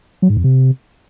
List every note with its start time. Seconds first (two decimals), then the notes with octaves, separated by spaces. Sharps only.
0.22 F#3
0.30 G#2
0.37 F2
0.44 C3